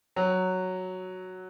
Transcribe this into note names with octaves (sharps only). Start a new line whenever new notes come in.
F#3